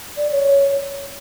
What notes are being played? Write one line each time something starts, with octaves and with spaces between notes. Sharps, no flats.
D5
C#5